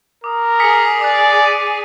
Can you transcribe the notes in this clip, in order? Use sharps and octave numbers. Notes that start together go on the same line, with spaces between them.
A#4 D6 D#6
G#4 D#6 B6 C#7
D5 D6 D#6 F#6
B6 D#7